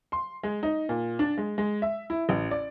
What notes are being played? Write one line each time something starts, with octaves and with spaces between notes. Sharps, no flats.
C6
G#3
D#4
A#2
D4
G#3
G#3
E5
E4
A1
D5